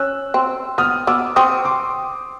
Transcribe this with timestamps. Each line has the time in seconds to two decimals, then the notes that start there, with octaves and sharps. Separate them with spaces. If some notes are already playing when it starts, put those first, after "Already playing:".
Already playing: C#4 E6 F#6
0.34 C4
0.78 B3 D#6 F6
1.07 B3 D6 E6
1.36 C4 C#6 D#6
1.65 C6 D6